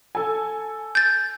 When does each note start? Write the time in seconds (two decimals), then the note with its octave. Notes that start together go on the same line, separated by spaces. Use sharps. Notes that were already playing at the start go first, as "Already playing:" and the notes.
0.15 A4 G#5
0.95 G6 A6